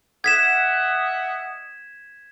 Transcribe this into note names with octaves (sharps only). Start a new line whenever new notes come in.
D#5 E5 F#5 G#6 B6 E7